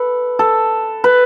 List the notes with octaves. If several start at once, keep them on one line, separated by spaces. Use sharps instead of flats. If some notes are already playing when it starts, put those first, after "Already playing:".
Already playing: A4 B4
A4
B4